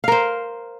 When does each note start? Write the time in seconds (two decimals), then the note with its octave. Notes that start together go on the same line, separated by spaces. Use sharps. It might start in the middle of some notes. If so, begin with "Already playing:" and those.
0.04 F5
0.08 A#4
0.12 C5